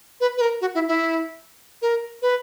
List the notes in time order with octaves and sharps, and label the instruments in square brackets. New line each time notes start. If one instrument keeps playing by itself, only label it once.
[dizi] B4
B4
A#4
F#4
E4
E4
A#4
B4